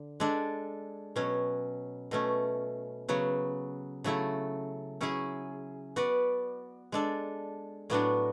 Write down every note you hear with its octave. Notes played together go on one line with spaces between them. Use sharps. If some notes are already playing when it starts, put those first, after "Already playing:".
Already playing: D3
G#3 D4 A4 D5
B2 F#3 C#4
B2 A3 C#4
C#3 F#3 B3
C#3 F#3 A3 E4 A4
F#3 C#4 E4 G#4
B3 F#4 B4 D5
G#3 D4 A4
A2 F#3 B3 D4 F#4